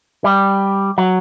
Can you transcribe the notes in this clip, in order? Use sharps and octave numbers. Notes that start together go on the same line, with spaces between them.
G3
F#3